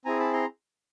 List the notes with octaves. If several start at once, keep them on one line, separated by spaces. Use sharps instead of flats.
C4 E4 G#4 G#5 A#5
A5 B5
A#5 C6